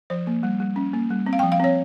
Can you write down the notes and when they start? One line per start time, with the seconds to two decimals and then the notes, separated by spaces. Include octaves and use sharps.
0.10 F3 C5
0.27 A#3
0.43 G3
0.60 G3
0.76 C#4
0.94 A#3
1.10 G3
1.26 C4
1.33 F5
1.39 F3 G5
1.52 F5
1.60 C4 C#5